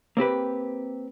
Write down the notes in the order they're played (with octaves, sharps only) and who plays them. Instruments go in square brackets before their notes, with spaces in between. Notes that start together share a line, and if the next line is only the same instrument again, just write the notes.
[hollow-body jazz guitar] A#3 C4 G4 B4